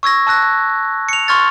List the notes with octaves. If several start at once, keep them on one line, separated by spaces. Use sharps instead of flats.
C#6 E6 G#6 A#6
A5 E6 F#6 A#6
C#7 F7
C6 C#6 F6 G#6 A6